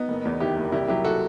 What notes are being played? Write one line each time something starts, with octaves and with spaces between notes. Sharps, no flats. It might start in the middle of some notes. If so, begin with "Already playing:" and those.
Already playing: B3 D#4
F#1
E2
D#3 E4 G4
F#1
C2 E4 G4
F#3 E4 G4
F#4 A4